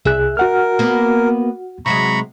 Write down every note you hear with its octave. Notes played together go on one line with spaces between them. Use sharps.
C2 G#4 E5 F#6
F#4 A#4 F#5 F6
A#3 B3
C3 F#3 G#3 A#5 B5 C#6